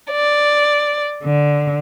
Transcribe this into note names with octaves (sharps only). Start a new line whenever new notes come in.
D5
D3